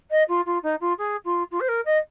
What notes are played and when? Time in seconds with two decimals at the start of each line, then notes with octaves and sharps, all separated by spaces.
0.11 D#5
0.29 F4
0.46 F4
0.63 D#4
0.81 F4
0.98 G#4
1.25 F4
1.51 F4
1.60 C5
1.69 A#4
1.86 D#5